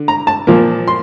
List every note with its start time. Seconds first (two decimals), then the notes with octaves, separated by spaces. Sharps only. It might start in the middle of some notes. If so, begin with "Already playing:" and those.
Already playing: D3
0.08 A#5
0.27 A5
0.47 A#2 F3 A#3
0.88 C6